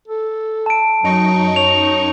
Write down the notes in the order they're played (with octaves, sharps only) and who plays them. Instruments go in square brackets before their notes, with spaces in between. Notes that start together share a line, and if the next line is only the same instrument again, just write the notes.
[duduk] A4
[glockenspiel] A5 D7
[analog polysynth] F#2 D#4 C#6 [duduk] F#3
[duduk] C#5 [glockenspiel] F7